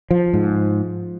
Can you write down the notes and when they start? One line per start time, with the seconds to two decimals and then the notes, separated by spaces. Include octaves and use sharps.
0.11 F3
0.33 G#2